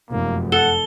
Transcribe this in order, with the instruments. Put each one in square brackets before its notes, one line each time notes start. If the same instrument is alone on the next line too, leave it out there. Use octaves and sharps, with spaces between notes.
[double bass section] F1 F#2 [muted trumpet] A#3
[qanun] A4 [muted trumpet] F#5 [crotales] G7